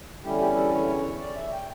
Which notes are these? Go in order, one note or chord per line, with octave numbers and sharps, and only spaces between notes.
E2 D3 G3 C#4 E4 G4
G4
A4
C#5
D5
E5
G5